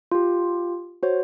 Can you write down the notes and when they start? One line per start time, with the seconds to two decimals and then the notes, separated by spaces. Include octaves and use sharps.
0.12 F4 G4
1.03 F#4 C5 C#5